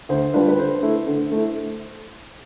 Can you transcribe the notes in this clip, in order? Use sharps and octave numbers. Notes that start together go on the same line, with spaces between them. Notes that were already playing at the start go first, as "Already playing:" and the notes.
D2 C5
D3 G3 D4 F4 B4
B4
D3 C5
A3 E4
D3
A3 E4